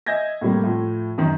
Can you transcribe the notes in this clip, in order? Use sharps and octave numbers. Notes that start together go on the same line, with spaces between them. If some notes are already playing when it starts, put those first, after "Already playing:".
D#5 E5 G#5 G6 G#6 A#6
A2 C3 G3 A#3
A2 F3
F#2 D#3